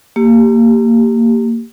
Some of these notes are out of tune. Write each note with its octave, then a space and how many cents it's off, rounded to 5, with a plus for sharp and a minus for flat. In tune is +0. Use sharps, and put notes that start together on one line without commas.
A#3 -20 G4 +0